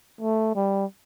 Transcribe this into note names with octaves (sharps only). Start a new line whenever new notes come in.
A3
G3